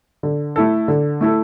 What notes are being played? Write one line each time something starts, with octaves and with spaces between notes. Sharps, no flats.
D3
A3 E4 A4
D3
A3 E4 A4